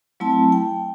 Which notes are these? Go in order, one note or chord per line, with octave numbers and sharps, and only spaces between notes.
F#3 A3 C4 E4 A5
G5